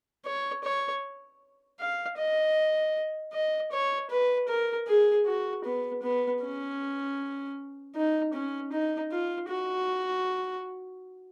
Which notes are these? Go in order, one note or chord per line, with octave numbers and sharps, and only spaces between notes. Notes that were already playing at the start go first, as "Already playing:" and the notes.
C#5
C#5
F5
D#5
D#5
C#5
B4
A#4
G#4
F#4
B3
B3
C#4
D#4
C#4
D#4
F4
F#4